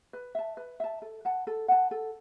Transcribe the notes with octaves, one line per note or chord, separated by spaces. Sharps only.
B4
E5 A5
B4
E5 A5
A4
F#5 A5
A4
F#5 A5
A4